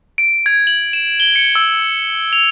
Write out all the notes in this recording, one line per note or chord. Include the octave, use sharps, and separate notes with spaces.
D7
G#6
F#7
E7
G7
C#7
E6
F7